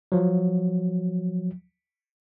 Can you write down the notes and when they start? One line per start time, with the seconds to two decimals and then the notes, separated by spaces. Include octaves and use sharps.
0.12 F3 F#3